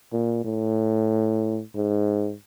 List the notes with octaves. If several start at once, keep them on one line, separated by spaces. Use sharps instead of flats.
A#2
A2
G#2